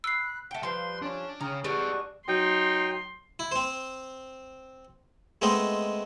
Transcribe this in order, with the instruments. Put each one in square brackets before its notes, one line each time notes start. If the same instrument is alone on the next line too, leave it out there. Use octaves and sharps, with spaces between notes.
[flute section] B5 F#6 [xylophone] E6 C7
[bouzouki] A3 G5 [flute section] F#5 A5
[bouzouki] F3 G3 [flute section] B4 C5 F5 [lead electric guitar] C6
[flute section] C#4 [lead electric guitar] D4
[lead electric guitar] C#3 [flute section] G5 D#6 F6 [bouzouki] A#5
[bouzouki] G3 G#3 D4 [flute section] F#4 A5 C#6 [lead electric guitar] G#4 B4
[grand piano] F#3 [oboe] D#4 [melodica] G5 [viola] C6
[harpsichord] E4
C4 C5
G#3 A3 B3 C4 C5 D#5